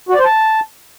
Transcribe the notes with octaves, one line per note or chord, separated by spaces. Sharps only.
F#4
D5
C5
A5